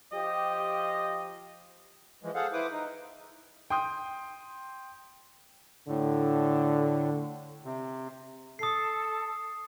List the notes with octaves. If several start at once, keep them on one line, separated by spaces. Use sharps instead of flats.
F3 G4 D#5
E3 F3 G#3
G#4 A4 C5 F5 F#5
E4 B4 C5 D6 D#6
D#4
G5 C6 D#6 G6
A2 D3
C3
A4 D#6 C7